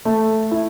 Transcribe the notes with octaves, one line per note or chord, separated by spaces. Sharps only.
A3
E4